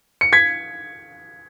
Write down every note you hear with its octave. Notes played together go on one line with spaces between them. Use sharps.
C#7
G#6 B6